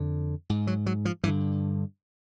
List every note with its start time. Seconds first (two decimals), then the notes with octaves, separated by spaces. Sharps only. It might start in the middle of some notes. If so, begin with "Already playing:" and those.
Already playing: F2 D3
0.50 G#2
0.67 F#3
0.86 F#3
1.05 F3
1.23 G2 E3
1.27 D3